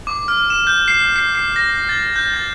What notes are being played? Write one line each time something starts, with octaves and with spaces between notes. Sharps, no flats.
D6
F6
E7
G6
C7
C7
C7
A#6
A6
G6
A6